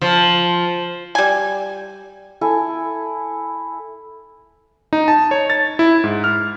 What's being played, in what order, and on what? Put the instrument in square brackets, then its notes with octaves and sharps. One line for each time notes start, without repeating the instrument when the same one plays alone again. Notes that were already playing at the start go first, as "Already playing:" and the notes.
[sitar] F3
[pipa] G3 G#5
[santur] E4 A4 G#5
[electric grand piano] D#4
A5
C#5
A6
E4
G#2
F6